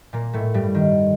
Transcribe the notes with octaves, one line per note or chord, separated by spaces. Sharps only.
A#2 A#3
A2 A3
G2 G3
D#3